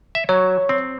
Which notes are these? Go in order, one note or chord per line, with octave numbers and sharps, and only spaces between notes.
E5
F#3 C#5
C4